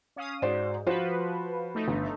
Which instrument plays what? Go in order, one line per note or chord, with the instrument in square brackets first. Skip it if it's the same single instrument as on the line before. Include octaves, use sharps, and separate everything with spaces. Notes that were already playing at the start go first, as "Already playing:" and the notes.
[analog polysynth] C#4 F5 D#6
[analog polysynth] G#2 [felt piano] F#4 C5 D5
[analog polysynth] F3 B4 [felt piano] F4 F#4 C5
[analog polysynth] A3 D#4
[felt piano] G1